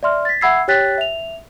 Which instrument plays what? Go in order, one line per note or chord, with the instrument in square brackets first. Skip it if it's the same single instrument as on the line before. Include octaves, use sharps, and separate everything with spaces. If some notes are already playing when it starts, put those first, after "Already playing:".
[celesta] D5 E5 C6 F6
A6 B6
E5 F#5 B5 E6 G#6 C7
G4 C#5 G5 F#6 A6 B6
E5 F7